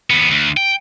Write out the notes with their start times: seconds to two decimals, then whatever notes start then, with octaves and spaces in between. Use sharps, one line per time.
0.10 D#2 B3
0.31 D2
0.57 G5